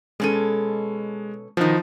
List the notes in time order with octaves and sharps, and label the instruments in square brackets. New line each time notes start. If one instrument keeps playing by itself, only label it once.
[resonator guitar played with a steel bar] B2 C#4 A4 [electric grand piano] G#3 D#7
[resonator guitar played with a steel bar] B2 D#3 [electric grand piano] F3 D#4